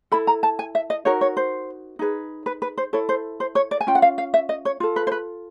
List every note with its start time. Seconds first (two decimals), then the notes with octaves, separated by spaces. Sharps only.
0.12 E4 A4 B5
0.27 A#5
0.43 A5
0.59 G#5
0.75 E5
0.90 D#5
1.05 D#4 F#4 A#4 C#5
1.21 C#5
1.37 C5
1.99 D#4 G#4 B4
2.46 B4
2.62 B4
2.78 C5
2.93 E4 A4 C#5
3.09 C5
3.40 C5
3.55 C#5
3.71 D5
3.81 G#5
3.87 C#4 F4 G5
3.95 F#5
4.02 F5
4.18 F5
4.34 E5
4.49 D#5
4.65 C#5
4.80 F4 A4
4.96 B4
5.07 C5
5.12 B4